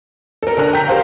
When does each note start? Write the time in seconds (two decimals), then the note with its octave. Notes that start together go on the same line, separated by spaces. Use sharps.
0.43 A4 A#4
0.57 D3 A#4 A#5 F#6
0.73 G5 A#5 G6 B6
0.88 G4 A#4 C5 F5